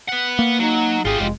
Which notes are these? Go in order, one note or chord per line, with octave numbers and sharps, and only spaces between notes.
B4 F#5
A#3
F#3 D#4
G#1 F4 G4 G#4
F1 G#3